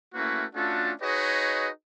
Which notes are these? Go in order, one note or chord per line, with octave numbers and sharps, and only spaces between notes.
A3 A#3 C#4 E4 F#4 B4
A3 C#4 D4 F4 F#4 A4
D#4 F#4 G#4 B4 C#5 D#5